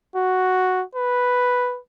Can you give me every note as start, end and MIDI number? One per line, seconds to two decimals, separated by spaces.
0.16 0.83 66
0.95 1.79 71